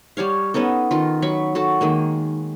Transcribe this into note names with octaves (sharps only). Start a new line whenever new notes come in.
G3 G4 C#5 F5
B3 C#4 D#4 A4
D#3 D#4 F4
F#3 B5 C#6
F#4 A4 A5
D#3 G#3 A#3